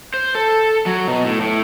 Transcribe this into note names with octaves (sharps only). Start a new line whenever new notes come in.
C5
A4
F#3
B2
A2
A2